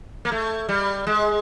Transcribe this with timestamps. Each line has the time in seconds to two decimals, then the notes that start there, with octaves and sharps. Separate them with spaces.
0.25 A#3
0.32 A3
0.69 G3
1.07 G#3